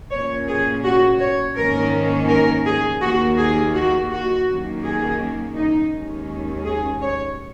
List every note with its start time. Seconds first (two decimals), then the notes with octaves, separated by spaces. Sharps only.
0.11 A#2 A#3 C#4 C#5
0.48 G#4
0.84 F#4
1.20 C#5
1.56 G#2 D#3 A#3 C#4 A#4
2.29 A#4
2.66 G#4
3.01 D#2 D#3 A#3 F#4
3.38 G#4
3.75 F#4
4.10 F#4
4.47 F#2 D#3 A#3 C#4
4.83 G#4
5.56 D#4
5.92 D#2 D#3 G#3 C#4
6.65 G#4
7.01 C#5